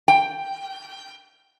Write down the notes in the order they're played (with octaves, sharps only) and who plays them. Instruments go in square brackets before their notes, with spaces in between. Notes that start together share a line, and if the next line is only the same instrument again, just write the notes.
[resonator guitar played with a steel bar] G5